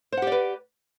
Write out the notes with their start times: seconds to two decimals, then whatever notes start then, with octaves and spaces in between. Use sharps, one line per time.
0.12 C5
0.17 F#5
0.22 G4
0.27 D5
0.32 B4